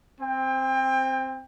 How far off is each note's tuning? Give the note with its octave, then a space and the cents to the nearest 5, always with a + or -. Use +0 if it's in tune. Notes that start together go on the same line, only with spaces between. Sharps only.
C4 +0 G5 +30